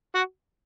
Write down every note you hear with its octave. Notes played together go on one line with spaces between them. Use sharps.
F#4